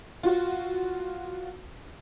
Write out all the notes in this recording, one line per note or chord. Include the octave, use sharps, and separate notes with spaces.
F4 F#4